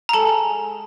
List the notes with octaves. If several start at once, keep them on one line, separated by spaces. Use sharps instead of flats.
A#5
G#3 A4 A5